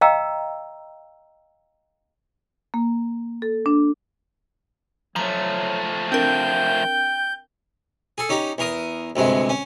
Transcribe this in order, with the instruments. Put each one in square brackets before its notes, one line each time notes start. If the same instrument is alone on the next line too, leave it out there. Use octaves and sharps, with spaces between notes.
[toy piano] D#5 F5 G5 A#5 E6
[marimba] A#3
A4
D4
[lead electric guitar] F3 A3 [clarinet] F#3 [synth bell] A#5
[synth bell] C4 D4 A#4 [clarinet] G5 [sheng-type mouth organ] G6
[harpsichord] G#4 A4
C#4 D#4 G4
E2 A#4 D#6
D2 G2 C3 G#3
C#4